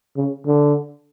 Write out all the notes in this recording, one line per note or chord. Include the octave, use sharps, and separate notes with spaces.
C#3
D3